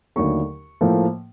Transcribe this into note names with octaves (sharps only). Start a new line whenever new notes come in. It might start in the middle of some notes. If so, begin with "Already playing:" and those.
D#2 D3 F#3 A3 C#6
A2 F3 A#3